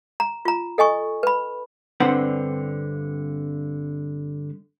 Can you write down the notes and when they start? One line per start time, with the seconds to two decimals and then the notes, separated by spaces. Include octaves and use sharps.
0.20 A#5
0.45 F4 A#5
0.78 A4 D#5 G#5 C#6
1.23 B4 B5
2.00 G2 D3 C4 B4 C5 F#5